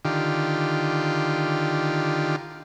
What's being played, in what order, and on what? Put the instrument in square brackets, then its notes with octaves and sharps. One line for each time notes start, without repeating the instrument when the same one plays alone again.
[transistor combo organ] D3 D#3 F4 G4